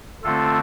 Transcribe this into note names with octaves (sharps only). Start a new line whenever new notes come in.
D3 A3 C4 F4 A4